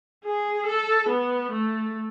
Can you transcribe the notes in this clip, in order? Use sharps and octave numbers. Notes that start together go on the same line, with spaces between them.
G#4
A4
B3
A3